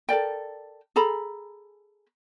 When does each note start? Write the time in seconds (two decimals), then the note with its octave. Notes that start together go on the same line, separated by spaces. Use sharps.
0.09 A4 A#4 D5 G5
0.96 G#4 A4 A#5 B5